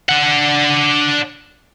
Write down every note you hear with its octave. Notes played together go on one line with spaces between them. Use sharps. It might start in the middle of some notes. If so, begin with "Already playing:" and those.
D4 F#5